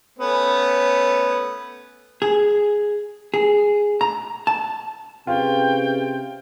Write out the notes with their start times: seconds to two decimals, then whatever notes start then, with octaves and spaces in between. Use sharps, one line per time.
0.19 A3 B3 C#4
2.22 G#4
3.34 G#4
4.01 A#5
4.47 A5
5.27 C3 C#4 F4 G#4 B4 G5